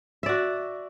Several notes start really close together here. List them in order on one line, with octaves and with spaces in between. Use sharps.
E5 D5 F#4